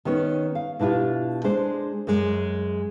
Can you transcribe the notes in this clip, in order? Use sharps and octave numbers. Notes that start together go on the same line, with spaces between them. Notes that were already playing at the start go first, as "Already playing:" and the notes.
D#3 B3 C#4 C#5
F5
B2 D4 E4 F4 G4
G#3 D4 C5
F#2 G#3